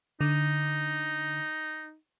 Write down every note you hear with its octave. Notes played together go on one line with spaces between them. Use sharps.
D3 D#4